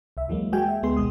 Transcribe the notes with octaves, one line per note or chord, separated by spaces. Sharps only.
C2 E5
D#2 E3 F#3 G#3 A#3
G#3 A#3 F#4 G5 G#5
E5
D2 G#3 B3 G#4 C6
G#1 B2 G#3 G#4 D#6